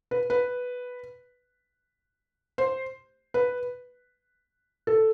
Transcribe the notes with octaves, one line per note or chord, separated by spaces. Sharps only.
B4
B4
C5
B4
A4